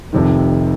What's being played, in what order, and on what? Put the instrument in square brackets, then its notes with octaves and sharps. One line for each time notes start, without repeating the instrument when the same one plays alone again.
[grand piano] F1 F2 C3 D#3